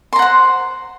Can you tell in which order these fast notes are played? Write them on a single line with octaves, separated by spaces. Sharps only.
C6 A#5 F#5 C5